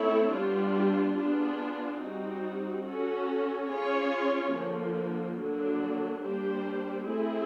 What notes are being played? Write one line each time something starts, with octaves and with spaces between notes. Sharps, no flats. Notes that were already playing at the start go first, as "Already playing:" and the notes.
Already playing: A3 C4 E4 A4 C#5
G3 B3 D4 F4
B3 D4 F4 G#4
G3 C4 D#4 F#4
C#4 F#4 A4
C#4 F4 G#4 C#5
D3 F3 A#3
D3 F#3 A#3 D4
G3 A#3 D4 G4 C5
A3 C4 E4 G#4